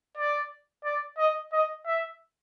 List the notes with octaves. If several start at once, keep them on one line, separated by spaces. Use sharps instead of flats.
D5
D5
D#5
D#5
E5